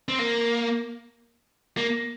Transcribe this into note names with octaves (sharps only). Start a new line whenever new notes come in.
C4
A#3
A#3